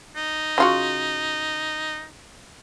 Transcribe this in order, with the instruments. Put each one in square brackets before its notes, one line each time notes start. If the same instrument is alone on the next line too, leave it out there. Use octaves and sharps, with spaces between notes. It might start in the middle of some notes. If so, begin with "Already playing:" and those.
[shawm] D#4
[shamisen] C#3 F4 F#4